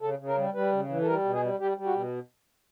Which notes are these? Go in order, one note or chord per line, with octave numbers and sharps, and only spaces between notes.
C#3 A4
C#3
A#4
G3
G3 B4
C#3
E3
A4
G3 A#4
B2
G#4
G3
G3 G4
G3
F#4
B2